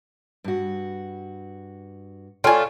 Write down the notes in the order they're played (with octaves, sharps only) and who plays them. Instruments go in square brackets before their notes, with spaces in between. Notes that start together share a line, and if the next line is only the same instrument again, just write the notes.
[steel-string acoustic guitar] G2 F#4
[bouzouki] A3 F4 [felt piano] C#5 D5 [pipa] G5 G#5